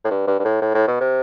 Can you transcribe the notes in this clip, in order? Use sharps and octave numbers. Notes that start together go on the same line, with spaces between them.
A2
G2
G2
G2
A2
A2
A2
B2
C3